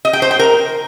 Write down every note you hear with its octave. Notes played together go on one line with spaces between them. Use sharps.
D#5
G5
C5
G5
A#4